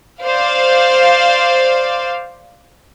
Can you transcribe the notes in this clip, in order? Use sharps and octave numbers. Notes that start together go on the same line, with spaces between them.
C5 D5 F5